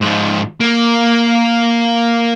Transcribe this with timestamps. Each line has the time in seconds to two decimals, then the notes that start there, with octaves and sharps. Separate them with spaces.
0.01 G#2 F3
0.60 A#3